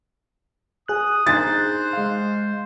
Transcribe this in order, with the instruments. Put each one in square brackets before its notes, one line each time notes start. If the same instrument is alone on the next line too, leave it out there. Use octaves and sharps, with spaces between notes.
[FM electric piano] G#4 F#6 [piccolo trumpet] D#6
[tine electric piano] D#4 [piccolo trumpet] C5 [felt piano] A6
[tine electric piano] G#3 F5